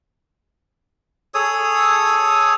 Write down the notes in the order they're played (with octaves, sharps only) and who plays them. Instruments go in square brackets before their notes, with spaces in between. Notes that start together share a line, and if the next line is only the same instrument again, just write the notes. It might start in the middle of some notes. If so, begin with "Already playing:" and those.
[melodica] G#4 A4 C#5 D#6